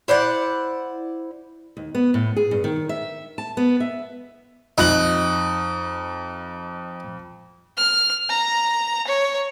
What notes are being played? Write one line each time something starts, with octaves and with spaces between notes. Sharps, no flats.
E4 C5 D5 F#5
D#2
B3
A2
G#4
G2
D#3
E5
A5
B3
E5
F2 D#4 F#6 F#7
F6
A#5
C#5